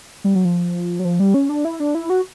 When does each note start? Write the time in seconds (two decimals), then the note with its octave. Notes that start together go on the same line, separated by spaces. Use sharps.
0.24 G3
0.35 F#3
0.45 F3
0.99 F#3
1.05 F3
1.20 G3
1.34 C#4
1.49 D4
1.65 E4
1.80 D4
1.95 E4
2.10 F#4